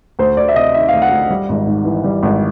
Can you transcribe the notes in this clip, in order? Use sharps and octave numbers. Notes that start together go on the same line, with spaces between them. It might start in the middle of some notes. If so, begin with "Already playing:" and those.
D2 C5
D2 D5
E5
C3 D#5
D#3 E5
D2 F5
F#5
D2
G3
G#1
G#2
E3
G3
G#1